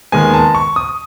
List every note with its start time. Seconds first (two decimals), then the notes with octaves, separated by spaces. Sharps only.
0.12 D#2 D#3 G#3 B3 G#5
0.34 A5
0.55 C#6
0.76 D#6